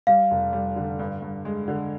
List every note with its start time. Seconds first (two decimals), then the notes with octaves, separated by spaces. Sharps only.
0.07 G3 F5
0.31 F1
0.53 G3
0.76 D3
0.99 G2
1.22 G2
1.45 G#3
1.68 D3